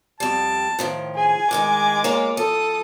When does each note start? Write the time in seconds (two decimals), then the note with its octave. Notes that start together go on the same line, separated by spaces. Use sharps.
0.20 F2 G3 A5
0.79 A2 D#3 F3
1.16 G#4 G#5
1.51 A2 D#3 G#3 D#4 D6
2.04 A#3 F4 C#5
2.37 F3 A4 D#6